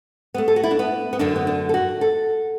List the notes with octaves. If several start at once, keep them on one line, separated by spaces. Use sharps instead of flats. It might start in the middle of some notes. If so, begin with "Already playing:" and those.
B3
A3
A4
F#4
E4
D4
B3
B3
F#2 D3 A3 D4
B3
D4
A4
F#4
A4